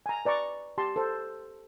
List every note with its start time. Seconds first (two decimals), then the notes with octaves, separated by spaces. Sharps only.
0.06 G#5 A#5
0.25 B4 D5 A#5 C#6
0.78 G4 A5 C6
0.96 A4 C5